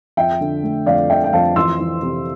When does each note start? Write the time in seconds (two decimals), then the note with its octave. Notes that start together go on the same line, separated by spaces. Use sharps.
0.17 F2 E5 G5
0.41 D3
0.63 A3
0.86 F2 D5 F5
1.10 D3 E5 G5
1.24 G5
1.33 F2 F5 A5
1.56 E3 C6 E6
1.79 E3
2.02 C3